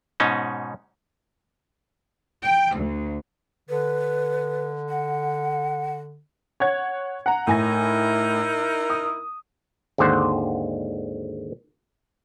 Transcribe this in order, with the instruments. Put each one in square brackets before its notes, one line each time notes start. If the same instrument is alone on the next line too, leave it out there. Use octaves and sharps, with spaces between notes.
[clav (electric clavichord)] G#2 B2 C#4 D#4
[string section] G5
D2
[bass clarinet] D3 [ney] B4
[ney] F#5
[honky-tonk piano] C#5 F#5 G#6
F#5 A#5
[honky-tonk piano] A2 G#5 A#6 [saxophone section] D#4 E4 A#4
[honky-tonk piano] D#6
[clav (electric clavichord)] G#1 D#2 D3 C5 F#5